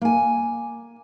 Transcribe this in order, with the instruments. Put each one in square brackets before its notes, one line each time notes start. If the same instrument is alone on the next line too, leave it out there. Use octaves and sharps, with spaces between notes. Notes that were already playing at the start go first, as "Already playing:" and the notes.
[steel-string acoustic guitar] A#3 G#5